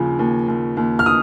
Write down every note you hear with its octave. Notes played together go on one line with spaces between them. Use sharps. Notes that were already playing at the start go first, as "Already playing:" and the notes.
Already playing: D#2 C#3 F3
D#2
D#2
D#2
F6
D#6